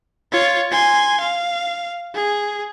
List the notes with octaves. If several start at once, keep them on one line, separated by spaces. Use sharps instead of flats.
F4 C#5
G#5 C6
F5
G#4